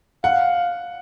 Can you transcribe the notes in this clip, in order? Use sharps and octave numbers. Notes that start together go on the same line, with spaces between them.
F5 F#5